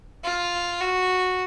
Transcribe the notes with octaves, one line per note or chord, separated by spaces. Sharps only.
F4
F#4